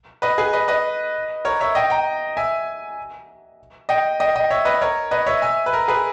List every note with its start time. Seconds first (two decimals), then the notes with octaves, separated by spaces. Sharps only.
0.22 B4 D#5
0.38 G#4 B4
0.53 B4 D#5
0.68 B4 D#5
1.45 A#4 C#5
1.61 C#5 E5
1.75 D#5 G5
1.90 G5 A#5
2.37 E5 G#5
3.89 D#5 G5
4.20 D#5 G5
4.36 D#5 G5
4.50 C#5 E5
4.65 B4 D#5
4.82 A#4 C#5
5.11 B4 D#5
5.26 C#5 E5
5.42 E5 G#5
5.66 B4
5.73 A#4
5.88 G#4 B4